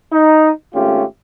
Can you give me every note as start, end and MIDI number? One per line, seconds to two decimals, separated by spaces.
0.12 0.50 63
0.74 1.03 32
0.74 1.03 57
0.74 1.03 61
0.74 1.03 65
0.74 1.03 67